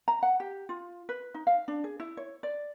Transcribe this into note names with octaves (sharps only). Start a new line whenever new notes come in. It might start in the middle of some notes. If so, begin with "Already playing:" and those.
A#5
F#5
G4
F4
B4
D#4
F5
D4
G#4
E4
C#5
D5